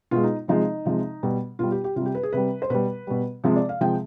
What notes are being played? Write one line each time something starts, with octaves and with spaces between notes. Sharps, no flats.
B2 G#3 F4
D#4
C3 F3 G#3 D#4
C3 F3 G#3
B2 G3
B2 G3 F4
G4
G4
C3 G3 F4 G4
B4
G#4
C3 G3 B4
C5
B2 G3 B4
B2 G3
C3 F3 G#3
D5
F5
C3 F3 G#3 G5